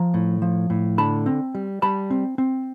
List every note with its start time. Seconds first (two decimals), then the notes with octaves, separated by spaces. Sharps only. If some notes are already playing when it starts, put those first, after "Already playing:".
Already playing: F3 A#5
0.14 A2
0.42 F3
0.70 A2
0.98 D3 A5 B5
1.26 C4
1.55 G3
1.82 G3 A5 B5
2.10 C4
2.38 C4